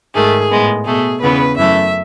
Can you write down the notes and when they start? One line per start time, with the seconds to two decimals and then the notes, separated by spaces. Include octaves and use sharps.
0.14 G#2 D#3 A3 G#4
0.50 A2 G#3 B3
0.85 B2 A3 G#4
1.22 E2 C#3 E3 B3 B4
1.57 F#2 E3 A3 E5